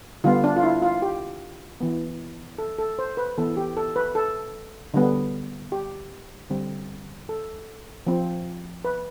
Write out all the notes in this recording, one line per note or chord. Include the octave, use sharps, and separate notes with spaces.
D3 G3 B3 F4
D4
F4
E4
F4
G4
E3 B3
A4
A4
C5
B4
E3 B3 A4
G4
A4
B4
A4
D3 G3 B3
G4
D3 G3 C4
A4
F3 C4
B4